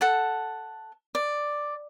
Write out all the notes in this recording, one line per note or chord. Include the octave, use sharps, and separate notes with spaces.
A4 F#5 A5
D5